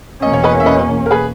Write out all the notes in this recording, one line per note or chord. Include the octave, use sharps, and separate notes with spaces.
E2 B2 A#3 C#4 D#5
C#5
B4 D#5
E5
B4 D#5
A#4
G#4 B4